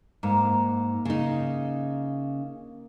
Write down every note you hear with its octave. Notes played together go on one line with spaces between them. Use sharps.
G#2 A#3
C#3 D#4